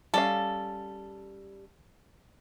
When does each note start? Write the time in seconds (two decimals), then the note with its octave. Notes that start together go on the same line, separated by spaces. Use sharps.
0.14 G3 C#4 A4 F5